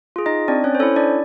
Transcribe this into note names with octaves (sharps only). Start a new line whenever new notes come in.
F4 G#4
D#4 D#5
C4 D4 D5
C#4 C#5
C5
C#4 E4 A4 C#5
D4 D5